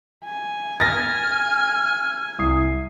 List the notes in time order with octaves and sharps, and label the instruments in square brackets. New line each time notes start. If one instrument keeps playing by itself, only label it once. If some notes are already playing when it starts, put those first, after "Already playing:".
[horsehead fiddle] G#5
[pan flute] F6 [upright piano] A6 A#6
[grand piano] C2 D#6 C7